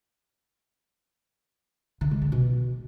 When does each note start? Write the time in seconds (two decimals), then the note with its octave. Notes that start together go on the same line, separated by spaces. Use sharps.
2.01 D3
2.11 G#3
2.22 C#3
2.32 B2